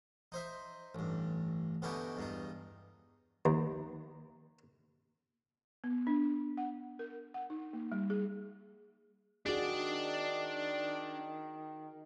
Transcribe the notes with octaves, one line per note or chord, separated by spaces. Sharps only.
D#4 C5 E5
A1 G2
B2 D3 C#4 D#4 E4 G4
E2 G2 D#4
D#2
B3
D4
F#5
A#4
F#5
D#4
A#3
G3
G#4
D#3 D4 F#4 G#4 D5